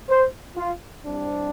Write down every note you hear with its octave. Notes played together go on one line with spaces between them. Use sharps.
C5
F4
C2 C3 G3 C4 D4